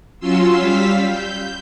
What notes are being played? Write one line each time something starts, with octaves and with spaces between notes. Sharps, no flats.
F#3 C#4 F4 C6 E6
G3 F5 E6 B6
G6